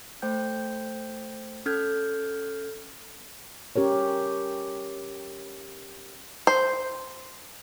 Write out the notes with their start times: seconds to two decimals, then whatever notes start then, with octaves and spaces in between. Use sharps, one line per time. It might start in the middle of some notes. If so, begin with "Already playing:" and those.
0.22 A3 C5 G5 G6
1.66 C#4 A4 F6 G6 G#6
3.76 C#4 G4 A#4 C#5
6.47 C5